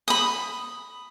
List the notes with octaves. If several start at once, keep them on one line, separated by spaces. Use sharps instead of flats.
B5 D#6